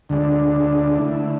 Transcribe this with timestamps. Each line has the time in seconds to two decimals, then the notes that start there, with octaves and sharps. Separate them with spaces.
0.09 D2 D3 G#3 D4
0.99 D3 A3 E4